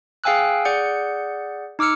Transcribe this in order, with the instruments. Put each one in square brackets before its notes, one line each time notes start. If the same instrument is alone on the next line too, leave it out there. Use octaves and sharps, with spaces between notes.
[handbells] G#4 F5 G5 G#5 E6 F#6
G#4 D5 F#5 G6 C#7
D#4 D6 E6 F6 C#7